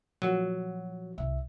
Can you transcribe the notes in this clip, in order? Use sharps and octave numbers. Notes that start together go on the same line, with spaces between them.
A#2 F3 F#3 F#4
C2 E5